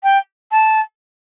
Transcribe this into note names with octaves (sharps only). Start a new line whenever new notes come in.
G5
A5